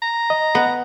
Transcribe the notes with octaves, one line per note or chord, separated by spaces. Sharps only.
A#5
D#5
B3